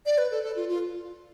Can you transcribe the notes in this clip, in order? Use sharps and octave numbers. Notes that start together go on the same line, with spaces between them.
D5
B4
A4
A4
F4
F4